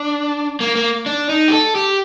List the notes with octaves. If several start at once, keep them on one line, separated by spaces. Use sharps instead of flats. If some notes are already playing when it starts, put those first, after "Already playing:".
Already playing: D4
A#3
A#3
D4
D#4
G4
A4
G4